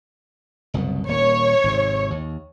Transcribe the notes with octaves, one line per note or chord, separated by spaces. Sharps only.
F#1 C2 B2
D#1 A#3 C#5
G#1 G#2 C3
D#2